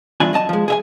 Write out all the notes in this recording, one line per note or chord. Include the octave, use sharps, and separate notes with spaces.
E2 G2 D4 E4 F4 G#5
F#2 D#5 A5
F3 G#3
G#4 E5 G#5